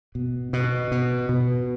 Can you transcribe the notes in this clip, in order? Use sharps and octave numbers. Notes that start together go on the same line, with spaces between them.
B2
B2
B2
B2